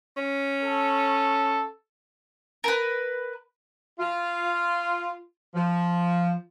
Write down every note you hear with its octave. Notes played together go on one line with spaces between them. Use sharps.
C#4
A4
A#4 B4
F4
F3